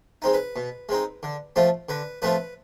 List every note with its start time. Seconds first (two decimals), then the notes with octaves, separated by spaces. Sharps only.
0.22 G#3 C4 D#4
0.33 B4
0.56 B2
0.89 G#3 C4 D#4
1.23 D3
1.56 F3 A3 C4 F4
1.89 D3 B4
2.22 F3 A3 C4 F4 B4